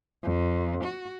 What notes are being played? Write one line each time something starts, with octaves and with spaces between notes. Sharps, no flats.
F2
F#4